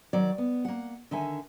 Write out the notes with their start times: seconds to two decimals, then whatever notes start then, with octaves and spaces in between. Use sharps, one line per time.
0.13 D#3 F#3 D5
0.38 B3
0.65 A#3 F#5
1.11 D3 D#3 E5 G#5